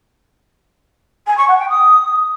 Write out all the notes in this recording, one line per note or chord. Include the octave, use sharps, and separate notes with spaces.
G#5
C#6
F#5
G5
D#6